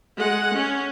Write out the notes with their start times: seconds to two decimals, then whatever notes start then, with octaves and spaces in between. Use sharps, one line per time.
0.17 G#3 F#5
0.54 C#4